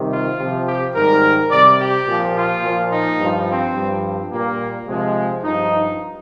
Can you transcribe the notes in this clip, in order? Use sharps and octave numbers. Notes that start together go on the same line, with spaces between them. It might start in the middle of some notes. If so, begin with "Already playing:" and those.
Already playing: C3 D#3 G3
F4
C3 F3
G4
G#2 D#3 G3 A#4
C3 G3 D5
G4
A#2 F3
F4
A#2 F3
D#4
G2 F3
C4
G2 F3
A#2 G3 A#3
C3 F3 G#3
G2 F3 D#4